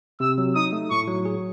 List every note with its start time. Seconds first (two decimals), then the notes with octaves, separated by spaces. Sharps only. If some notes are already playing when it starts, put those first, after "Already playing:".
0.20 C3 E6
0.38 F#3
0.55 D#4 D#6
0.72 A3
0.91 A2 C#6
1.08 F#3
1.25 G#4